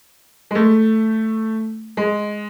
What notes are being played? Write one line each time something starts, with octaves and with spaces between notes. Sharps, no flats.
G#3
A3
G#3